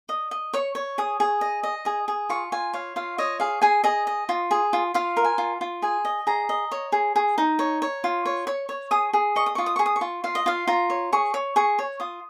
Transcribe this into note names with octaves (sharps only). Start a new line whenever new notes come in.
D#5
D#5
C#5 C#6
C#5
G#4 D#6
G#4
D#5
D#5
G#4 D#6
G#4
F4 C#6
F4 G#5
C#5 F5
F4 F5
C#5 D#5
G#4 F5
G#4 G#5
G#4 D#5
D#5
F4
G#4
F4
F4 F5
A#4
G#5
F4
F4
G#4 G#5
D#5
G#4 A#5
D#5
C#5
G#4
G#4
D#4
C#5
C#5
F4
C#5
C#5 C#6
C#5
G#4 D#6
G#4
D#5 C#6
D#6
F4 C#6
D#6
G#4 C#6
D#6
C#6
F4
F4 F5
D#5
F4 F5
F4 A#5
C#5
G#4 C#6
C#5
G#4 C#6
C#5
F4 D#6